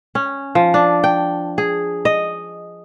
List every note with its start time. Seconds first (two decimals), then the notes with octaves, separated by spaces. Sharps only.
0.15 C#4
0.55 F3
0.74 D4
1.04 G5
1.58 G#4
2.05 D#5